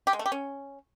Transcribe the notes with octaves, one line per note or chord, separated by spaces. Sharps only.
G4
G#3
A3
G4
C#4